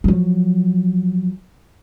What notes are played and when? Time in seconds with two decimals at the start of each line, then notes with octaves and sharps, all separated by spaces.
0.04 F3 F#3